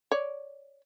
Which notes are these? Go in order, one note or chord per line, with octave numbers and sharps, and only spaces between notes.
C#5 D5